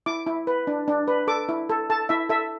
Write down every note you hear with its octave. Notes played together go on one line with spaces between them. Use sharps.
E4 D6
E4
B4
D4
D4
B4
A4 D6
E4
A4
A4 A5
E4 E5
A4 E5